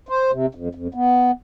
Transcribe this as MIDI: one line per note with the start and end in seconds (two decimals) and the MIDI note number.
0.09 0.31 72
0.32 0.46 48
0.55 0.68 41
0.75 0.87 41
0.94 1.31 59